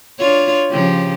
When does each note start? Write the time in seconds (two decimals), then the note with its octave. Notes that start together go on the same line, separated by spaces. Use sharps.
0.18 D4 F4 C#5
0.71 C#3 F3 G4